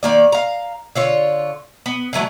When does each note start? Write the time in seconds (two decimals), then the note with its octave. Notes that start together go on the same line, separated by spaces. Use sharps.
0.03 D#3 A#3 D5
0.32 F5 A#5
0.95 D3 F4 C#5
1.86 B3
2.13 D3 E3 F#3 A3